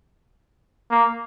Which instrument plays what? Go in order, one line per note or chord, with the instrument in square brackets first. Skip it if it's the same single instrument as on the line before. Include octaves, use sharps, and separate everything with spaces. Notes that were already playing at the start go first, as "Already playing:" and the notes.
[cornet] A#3